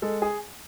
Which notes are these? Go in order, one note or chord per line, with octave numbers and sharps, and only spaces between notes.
G#3 A4
G#4